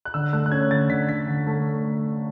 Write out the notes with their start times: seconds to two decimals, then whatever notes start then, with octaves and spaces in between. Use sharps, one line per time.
0.05 F#6
0.14 D3 E6
0.33 A3 F#6
0.46 F#6
0.52 C#4 G#6
0.70 D3 A6
0.90 D3 B6
1.09 D3 B6
1.28 D3
1.47 A3